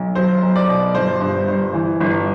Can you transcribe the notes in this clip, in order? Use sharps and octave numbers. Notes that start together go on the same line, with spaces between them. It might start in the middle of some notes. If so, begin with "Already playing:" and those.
Already playing: B1
F#3 C5
B1
D5
B2
G1 C5
G2
G1
E3
G1